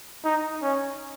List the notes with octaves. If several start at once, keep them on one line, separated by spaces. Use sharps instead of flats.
D#4
C#4